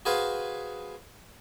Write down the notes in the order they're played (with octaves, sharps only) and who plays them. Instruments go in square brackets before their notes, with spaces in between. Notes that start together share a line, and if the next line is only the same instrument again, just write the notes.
[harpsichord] F#4 G#4 B4 C5 F5